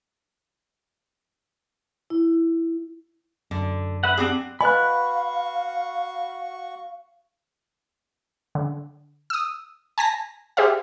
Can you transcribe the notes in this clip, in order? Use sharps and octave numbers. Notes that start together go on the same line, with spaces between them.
E4
F#2 D3
B4 E5 F#5
C4 D4 G4 G#4 F#5
F#4 B4 D#5 F5 G#5 B5 C#6 F#6
D3
D#6 E6
G#5 A5 A#6
G4 G#4 C5 E5 F5